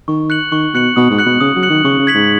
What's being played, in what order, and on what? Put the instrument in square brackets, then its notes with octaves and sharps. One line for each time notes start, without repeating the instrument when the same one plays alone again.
[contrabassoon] D#3 [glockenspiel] C#6
[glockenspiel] F#6 C#7 F#7
[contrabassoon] D#3 [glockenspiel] C#6
[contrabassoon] B2 [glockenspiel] F#6 C#7 F#7
[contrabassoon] B2 [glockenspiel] D#6
[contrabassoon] G#2
[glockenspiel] F#6 C#7 F#7
[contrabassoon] B2
[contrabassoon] C#3 [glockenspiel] D#6
[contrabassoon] F#3
[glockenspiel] F#6 C#7 F#7
[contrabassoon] D#3
[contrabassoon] C#3 [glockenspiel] C#6
[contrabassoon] C#3
[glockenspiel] G#6 B6 F#7
[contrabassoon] G#2